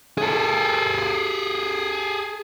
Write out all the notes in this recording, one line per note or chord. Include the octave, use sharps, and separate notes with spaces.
G#4 A4